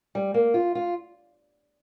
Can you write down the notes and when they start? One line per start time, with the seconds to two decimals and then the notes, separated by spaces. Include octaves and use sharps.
0.15 G3
0.34 A#3
0.54 F4
0.75 F4